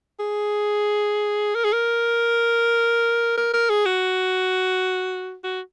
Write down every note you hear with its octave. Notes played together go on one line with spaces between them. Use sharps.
G#4
A#4
G#4
A#4
A#4
A#4
G#4
F#4
F#4